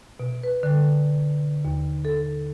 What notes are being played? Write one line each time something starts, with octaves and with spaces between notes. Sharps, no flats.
B2
B4
D3
D#2
A4